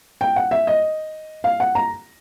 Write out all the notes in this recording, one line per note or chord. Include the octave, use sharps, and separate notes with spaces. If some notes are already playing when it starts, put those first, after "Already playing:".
G5
F#5
E5
D#5
F5
F#5
A#5